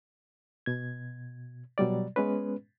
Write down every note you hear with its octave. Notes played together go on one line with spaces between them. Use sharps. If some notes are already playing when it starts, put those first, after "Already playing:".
B2 G#6
B2 F#3 G3 D5
G#3 B3 C#4 B4